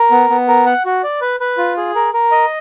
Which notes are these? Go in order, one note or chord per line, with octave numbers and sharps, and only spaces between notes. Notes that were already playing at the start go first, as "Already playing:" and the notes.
Already playing: A#4
B3
B3
A#4
F#5
F#4
D5
B4
B4
F4
G#4
A#4
A#4
D#5